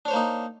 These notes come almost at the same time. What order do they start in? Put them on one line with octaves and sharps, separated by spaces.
D4 C#5 C5 A#3 D#4